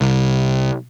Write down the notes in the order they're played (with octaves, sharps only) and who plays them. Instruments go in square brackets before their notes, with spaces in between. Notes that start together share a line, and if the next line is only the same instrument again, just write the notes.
[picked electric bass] C2